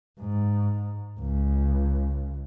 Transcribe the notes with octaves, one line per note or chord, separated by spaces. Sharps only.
G#2
C#2